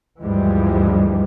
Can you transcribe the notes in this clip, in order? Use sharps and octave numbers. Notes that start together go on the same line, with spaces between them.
D2 G2 E3 F3 G3 G#3